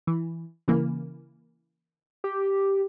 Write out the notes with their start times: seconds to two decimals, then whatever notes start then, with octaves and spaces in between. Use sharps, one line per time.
0.07 E3
0.68 C#3 E3 A#3
2.24 G4